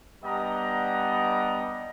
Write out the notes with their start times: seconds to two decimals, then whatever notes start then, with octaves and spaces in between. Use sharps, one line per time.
0.23 G3 B3 D4 D#5 F#5 A#5